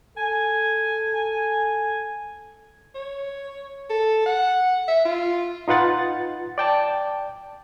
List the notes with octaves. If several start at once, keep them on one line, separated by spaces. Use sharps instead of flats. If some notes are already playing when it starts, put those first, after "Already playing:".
A4 G#5
C#5
A4
F#5
E5
F4
D#4 F4 B4 F#5 A6
D5 G5 A5